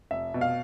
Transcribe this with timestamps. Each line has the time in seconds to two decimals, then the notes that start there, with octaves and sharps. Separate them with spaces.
0.11 F1 E5
0.34 B2
0.41 F5